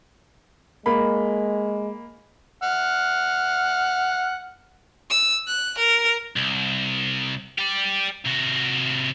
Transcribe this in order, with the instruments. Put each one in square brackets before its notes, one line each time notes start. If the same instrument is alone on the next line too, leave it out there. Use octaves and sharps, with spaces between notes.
[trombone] G#3 [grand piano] A#3 B5
[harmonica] F#5 F6
[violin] E6
F#6
A#4
[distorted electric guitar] C2
G4 D5
C3 F#4